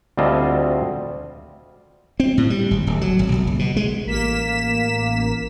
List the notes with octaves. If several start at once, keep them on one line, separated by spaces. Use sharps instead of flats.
D2 G3 C4 F4 D#5 A5
C4
A2
G3
G#1
D1
F#3
G#1
B1
F#1
B2
G#3
A1 A#3 B6 E7